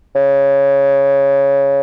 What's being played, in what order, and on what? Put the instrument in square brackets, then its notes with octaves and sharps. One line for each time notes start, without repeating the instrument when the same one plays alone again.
[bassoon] C#3